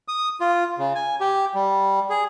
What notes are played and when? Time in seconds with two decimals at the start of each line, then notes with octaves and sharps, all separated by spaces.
0.08 D#6
0.41 F4
0.78 C#3
0.95 G#5
1.21 G4
1.55 G3
2.10 G#4